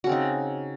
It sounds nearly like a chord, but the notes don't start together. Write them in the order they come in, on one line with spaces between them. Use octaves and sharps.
F#4 C#3 C4 D#4